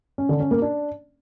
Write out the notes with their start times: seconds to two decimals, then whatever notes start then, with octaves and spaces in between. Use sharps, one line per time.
0.18 C#4
0.29 D3
0.40 C#4
0.51 A#3
0.62 D4